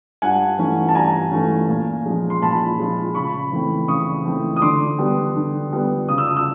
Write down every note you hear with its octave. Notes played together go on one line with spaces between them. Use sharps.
G2 F#5 G#5
E3 A3 C#4
A5
G2 G#5 A#5
E3 A3 C#4
A#2
F3 G#3 C#4
C6
A#2 A5 B5
F3 G#3 C#4
C#3 B5 C#6
E3 A3 C4
C#3 C#6 D#6
E3 A3 C4
D#6
D3 C6 D6
G3 B3
D3
G3 B3
C#3 D#6
E6
D#6
E6